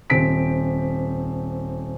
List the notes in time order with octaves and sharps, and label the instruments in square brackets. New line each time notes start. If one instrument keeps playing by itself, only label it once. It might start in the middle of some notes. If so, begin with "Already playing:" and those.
[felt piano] D#1 C4 C5 B6 D7